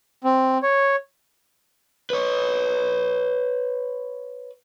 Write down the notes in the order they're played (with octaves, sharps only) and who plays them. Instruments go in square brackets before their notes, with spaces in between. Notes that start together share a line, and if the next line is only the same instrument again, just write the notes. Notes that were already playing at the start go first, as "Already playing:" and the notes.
[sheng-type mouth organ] C4
C#5
[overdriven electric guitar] B4 C#5